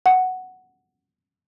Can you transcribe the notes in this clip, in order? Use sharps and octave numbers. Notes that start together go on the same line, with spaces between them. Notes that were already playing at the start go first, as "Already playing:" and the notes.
F#5